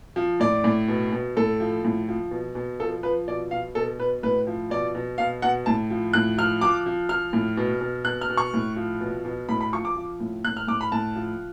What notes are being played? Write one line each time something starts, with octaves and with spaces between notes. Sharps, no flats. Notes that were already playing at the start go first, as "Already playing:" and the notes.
F3
A2 D5
A2
B2
B2
A2 A4
F3
A2
F3
B2
B2
F3 A4
F3 B4
B2 D5
B2 F5
B2 A4
B2 B4
A2 B4
F3
B2 D5
B2
B2 F5
B2 F#5
A2 A5
F3
A2 F#6
F3 F6
F3 D6
F3
F3 F6
A2
B2
B2
B2 F#6
F6
B2
C#6
A2
F3
B2
B2
A2 B5
B5
F3 C#6
D6
F3
A2
A2 F#6
F6
A2 D6
B5
A2 A5
F3